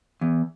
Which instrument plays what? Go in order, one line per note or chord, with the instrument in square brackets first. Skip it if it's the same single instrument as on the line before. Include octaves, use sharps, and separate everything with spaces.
[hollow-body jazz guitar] E2